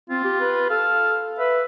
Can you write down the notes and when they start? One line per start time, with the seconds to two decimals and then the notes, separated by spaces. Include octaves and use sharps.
0.10 C4 F4
0.24 G4
0.40 B4
0.70 A4 F5
1.39 B4 E5